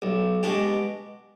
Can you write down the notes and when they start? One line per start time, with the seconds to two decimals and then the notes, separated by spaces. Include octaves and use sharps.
0.02 B1
0.43 B2 G#3 D4 G4